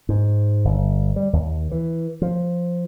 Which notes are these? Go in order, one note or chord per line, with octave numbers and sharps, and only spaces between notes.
G#2
G1
G3
D#2
E3
F3